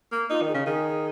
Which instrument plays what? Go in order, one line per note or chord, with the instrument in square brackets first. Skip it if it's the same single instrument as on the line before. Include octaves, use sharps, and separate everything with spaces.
[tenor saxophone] A#3
[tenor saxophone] D#4 [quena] F4
[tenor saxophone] D#3
[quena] G#4
[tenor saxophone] C#3
[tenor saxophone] D#3 [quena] G#4